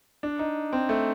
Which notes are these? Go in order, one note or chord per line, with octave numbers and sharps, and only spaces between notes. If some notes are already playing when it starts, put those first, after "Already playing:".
D4
D#4
C4
A3